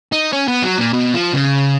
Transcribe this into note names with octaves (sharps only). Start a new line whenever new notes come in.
D#4
C#4
B3
F#3
A#2
B2
F3
C#3